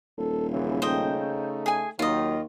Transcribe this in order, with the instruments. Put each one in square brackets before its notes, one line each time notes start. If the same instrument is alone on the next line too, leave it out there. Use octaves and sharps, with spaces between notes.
[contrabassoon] D#1 [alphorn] A4
[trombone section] F#2 E3 E4 [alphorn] C#3
[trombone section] A3 D#4 [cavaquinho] C5 D#5 G5
[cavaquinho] G#4 G#5
[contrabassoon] D#2 [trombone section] D#3 [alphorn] F#3 [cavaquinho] F4 D#5